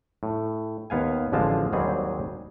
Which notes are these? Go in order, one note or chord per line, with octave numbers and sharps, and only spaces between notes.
A2
D#2 B3 F5 G#5
A1 D3 F3 G#3 F4 A5
D#2 G#2 F#3 G3 C4 G#4